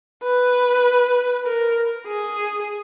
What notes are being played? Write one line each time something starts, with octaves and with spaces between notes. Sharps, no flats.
B4
A#4
G#4